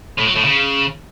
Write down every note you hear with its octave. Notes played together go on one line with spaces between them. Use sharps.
A2
F#3
A2
C#3